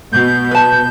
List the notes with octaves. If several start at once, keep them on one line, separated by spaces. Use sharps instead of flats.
B2 G6
B4 A5